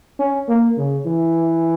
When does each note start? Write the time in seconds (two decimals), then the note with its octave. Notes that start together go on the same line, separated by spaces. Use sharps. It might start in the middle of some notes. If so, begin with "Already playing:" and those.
0.19 C#4
0.49 A#3
0.78 C#3
1.06 E3